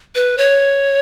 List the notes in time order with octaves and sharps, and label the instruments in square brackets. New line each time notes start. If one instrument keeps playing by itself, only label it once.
[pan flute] B4
C#5